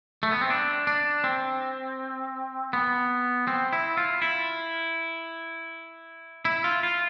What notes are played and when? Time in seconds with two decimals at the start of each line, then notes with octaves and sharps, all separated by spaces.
0.23 A3
0.31 B3
0.41 C4
0.50 D4
0.87 D4
1.24 C4
2.73 B3
3.48 C4
3.73 E4
3.97 F4
4.22 E4
6.45 E4
6.64 F4
6.83 F4